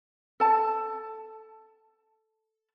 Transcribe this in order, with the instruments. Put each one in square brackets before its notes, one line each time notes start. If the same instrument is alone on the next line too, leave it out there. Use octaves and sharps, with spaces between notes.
[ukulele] A4 A5